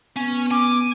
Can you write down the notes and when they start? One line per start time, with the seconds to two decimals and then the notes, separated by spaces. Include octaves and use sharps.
0.16 B3 C#4
0.51 G#5 D6